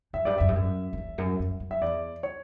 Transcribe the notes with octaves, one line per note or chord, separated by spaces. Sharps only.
F#2 E5
G2 D5
F#2 E5
G2
F#2
F#2
E2
F#2
F#2
F#2
E5
E2 D5
C#5